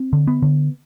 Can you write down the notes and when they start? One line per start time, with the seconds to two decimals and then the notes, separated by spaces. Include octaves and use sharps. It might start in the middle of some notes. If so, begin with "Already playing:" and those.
Already playing: C4
0.13 D3
0.27 B3
0.42 D3